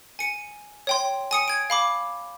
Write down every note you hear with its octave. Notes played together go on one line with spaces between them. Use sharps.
G#5 C#7
C#5 G5 C6
G#5 D#6 C#7
G#6 D7
F5 B5 D6